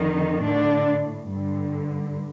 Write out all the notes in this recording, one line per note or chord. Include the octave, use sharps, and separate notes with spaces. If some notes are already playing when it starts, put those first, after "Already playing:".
Already playing: F2 D3 D#3 D#4
A2 D3 D4
G2 D3